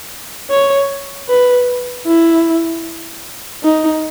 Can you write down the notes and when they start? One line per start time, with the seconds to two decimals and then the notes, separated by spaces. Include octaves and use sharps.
0.50 C#5
1.29 B4
2.06 E4
3.63 D#4